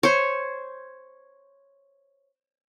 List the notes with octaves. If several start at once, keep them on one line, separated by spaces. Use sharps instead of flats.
C5 C#5